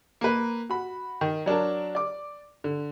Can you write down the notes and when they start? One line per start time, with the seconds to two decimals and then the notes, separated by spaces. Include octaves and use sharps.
0.21 A#3 B4
0.69 F#4 B5
1.21 D#3
1.46 F#3 D4 A#4 A5
1.95 D5 D6
2.64 D3